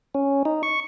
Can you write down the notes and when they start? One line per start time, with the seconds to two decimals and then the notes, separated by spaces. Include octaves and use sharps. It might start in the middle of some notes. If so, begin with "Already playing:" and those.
0.15 C#4
0.45 D#4
0.63 C#6